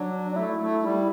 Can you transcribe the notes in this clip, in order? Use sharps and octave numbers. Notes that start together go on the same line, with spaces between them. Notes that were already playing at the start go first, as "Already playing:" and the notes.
Already playing: F#3 D4
D4
A3 E4
A3
G3 E4